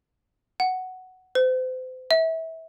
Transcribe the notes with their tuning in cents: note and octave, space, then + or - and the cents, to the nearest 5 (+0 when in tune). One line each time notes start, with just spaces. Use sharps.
F#5 +5
C5 -35
E5 -25